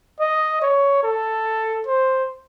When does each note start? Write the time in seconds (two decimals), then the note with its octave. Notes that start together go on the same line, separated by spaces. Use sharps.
0.20 D#5
0.62 C#5
1.03 A4
1.86 C5